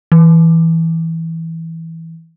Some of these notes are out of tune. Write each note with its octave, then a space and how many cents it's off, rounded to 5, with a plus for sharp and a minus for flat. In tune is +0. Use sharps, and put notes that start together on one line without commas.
E3 -10